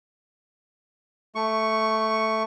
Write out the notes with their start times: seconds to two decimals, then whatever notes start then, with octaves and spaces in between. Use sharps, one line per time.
1.35 A3 C#6